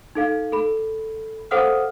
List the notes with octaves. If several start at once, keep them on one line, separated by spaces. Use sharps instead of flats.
D#4 A4 F5
A4 B5
A4 C5 F5 F#5 D#6 F6